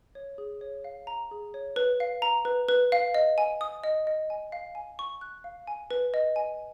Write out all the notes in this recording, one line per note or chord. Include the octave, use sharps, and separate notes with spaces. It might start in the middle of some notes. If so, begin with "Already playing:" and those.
C#5
G#4
C#5
F5
A#5
G#4
C#5
B4
F5
A#5
B4
B4
F5
D#5
G#5
D#6
D#5
D#5
G#5
F5
G#5
C#6
F#6
F5
G#5
B4
D#5
G#5